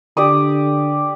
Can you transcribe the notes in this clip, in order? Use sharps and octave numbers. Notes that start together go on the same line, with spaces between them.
D3 G4 D5 D#6